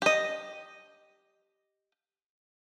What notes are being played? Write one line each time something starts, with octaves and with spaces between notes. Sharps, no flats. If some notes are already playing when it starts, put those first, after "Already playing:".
G4 D#5